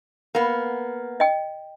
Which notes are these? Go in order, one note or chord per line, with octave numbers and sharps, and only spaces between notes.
A#3 B3
D#5 G5